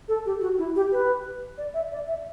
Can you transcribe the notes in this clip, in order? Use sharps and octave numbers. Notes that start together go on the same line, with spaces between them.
A4
G4
F#4
E4
G4
B4
D5
E5
D5
E5